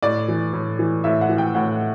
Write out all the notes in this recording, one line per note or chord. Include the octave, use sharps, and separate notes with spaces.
A2 D5
E3
A2
E3
A2 E5
F#5
E3
G5
A2 F#5